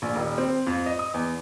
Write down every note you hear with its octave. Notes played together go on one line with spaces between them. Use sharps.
A#1
D#1
C4
F2
D#5
D#6
E2